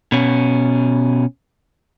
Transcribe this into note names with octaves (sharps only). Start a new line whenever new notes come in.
B2 C#4